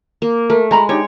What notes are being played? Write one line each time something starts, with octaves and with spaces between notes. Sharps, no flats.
A#3
A3 A#4
G#3 F4 A#5 B5
D4 D#4 G4 C#5